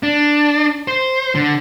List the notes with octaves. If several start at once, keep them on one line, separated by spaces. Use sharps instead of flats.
D4
C5
D3